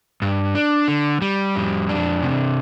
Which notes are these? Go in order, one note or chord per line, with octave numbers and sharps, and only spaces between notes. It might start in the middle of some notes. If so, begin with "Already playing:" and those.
G2
D4
D3
G3
F2
D4
C3